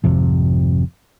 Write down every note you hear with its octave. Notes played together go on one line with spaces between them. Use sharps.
G#1 F2 C3 F3